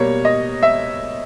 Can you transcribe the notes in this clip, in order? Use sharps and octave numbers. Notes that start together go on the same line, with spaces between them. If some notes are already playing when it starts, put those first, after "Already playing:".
Already playing: B2 G3 A#3 C#5
D#5
E5